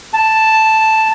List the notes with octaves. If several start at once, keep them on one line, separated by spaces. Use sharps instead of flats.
A5